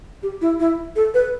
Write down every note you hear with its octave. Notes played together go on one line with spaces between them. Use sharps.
G4
E4
E4
A4
B4